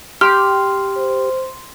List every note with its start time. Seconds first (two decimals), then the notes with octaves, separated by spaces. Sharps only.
0.21 G4 C6 F6
0.97 C5